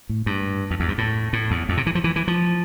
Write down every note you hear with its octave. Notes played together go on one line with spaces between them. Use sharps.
A2
G2
F2
E2
G2
A2
A2
E2
F2
C3
E3
F3
E3
E3
F3